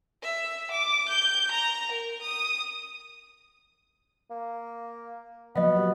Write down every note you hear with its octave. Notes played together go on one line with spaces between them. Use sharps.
E5
D6
G6
A#5
A#4
D#6
A#3
F3 F#3 A#3 B3 D#5 F5
G4